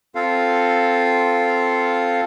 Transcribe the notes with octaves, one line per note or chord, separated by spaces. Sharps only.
C4 F4 A4 F5